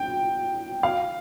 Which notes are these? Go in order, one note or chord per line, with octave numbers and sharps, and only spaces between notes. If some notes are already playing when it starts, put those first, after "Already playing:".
Already playing: G5
F5